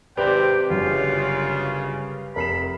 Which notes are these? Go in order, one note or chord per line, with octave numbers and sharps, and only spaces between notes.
G#1 C3 G4 B4 C5 D5 G5
G1 F#2 C#3 F4
F1 A#4 B5 C7 E7